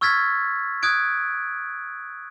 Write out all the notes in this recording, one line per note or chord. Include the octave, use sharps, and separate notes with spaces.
C#6 E6 F6 G#6 A6 B6
D#6 F#6 G#6 D7